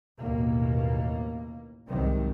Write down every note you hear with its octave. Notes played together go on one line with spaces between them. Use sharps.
A1 D#2 B2 A#3
C2 G#2 C3 D#3 F#3